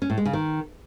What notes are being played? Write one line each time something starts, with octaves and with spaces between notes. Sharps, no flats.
C#4
A2
G#3
C#3
D#3